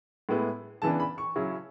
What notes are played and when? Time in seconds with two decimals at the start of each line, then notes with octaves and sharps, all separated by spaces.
0.29 A2 G#3 B3 E4
0.82 C#3 E3 B3 D4 A5
1.00 B5
1.18 C#6
1.36 C#3 F#3 C#4 E4